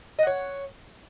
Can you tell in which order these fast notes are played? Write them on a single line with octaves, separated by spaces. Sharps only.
D#5 F#5 C#5